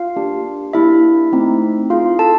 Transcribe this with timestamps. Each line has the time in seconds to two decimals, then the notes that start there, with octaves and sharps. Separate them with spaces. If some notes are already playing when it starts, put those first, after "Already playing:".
Already playing: F4 F5
0.16 A#3 D4 G4
0.73 A#3 D4 E4 G4 E5
1.32 A3 C4 D#4
1.90 C4 E4 F4 G#4 F5
2.19 A4 A5